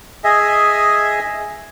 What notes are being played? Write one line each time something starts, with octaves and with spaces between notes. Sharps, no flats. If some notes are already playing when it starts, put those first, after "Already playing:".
G#4 D#5 E5 G#5